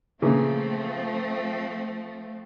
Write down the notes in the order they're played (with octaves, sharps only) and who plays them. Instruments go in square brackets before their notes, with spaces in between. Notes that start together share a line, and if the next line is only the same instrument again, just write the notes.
[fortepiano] A#2 C#3 E3 [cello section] F3 A3 C4